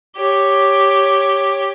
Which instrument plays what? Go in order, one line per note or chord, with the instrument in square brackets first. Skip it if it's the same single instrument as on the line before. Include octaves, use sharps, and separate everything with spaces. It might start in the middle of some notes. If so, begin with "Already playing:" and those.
[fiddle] G4 C#5